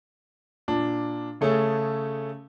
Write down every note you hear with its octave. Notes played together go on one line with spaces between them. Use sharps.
A#2 D4
C#3 A3 C#4 G#4 A4